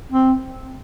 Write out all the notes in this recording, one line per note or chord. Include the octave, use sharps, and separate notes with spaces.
C4